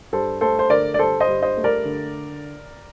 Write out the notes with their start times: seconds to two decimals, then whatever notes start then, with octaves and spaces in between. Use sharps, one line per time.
0.13 G2 A4 C5
0.41 A3 A4 C5
0.59 C5
0.70 D3 A#4 D5
0.94 D5
0.99 G2 A4 C5
1.20 C5 D#5
1.27 G2
1.42 C5 D#5
1.57 A3
1.64 A#4 D5
1.85 D3